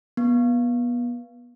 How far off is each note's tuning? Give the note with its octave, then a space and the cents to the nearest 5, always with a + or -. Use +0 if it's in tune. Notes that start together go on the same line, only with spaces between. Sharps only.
B3 -30